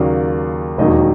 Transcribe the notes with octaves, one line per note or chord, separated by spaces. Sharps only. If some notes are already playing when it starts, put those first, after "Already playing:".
Already playing: D#2 C#3 F#3 A#3 D5
E1 D#2 D#3 F#3 D#5